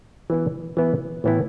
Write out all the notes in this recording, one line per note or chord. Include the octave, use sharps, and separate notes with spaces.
E3 B3 E4
E3 B3 E4
A2 E3 B3 E4